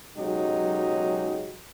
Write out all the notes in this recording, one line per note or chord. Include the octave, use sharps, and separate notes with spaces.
B1 C#3 F#3 G#3 D#4 G4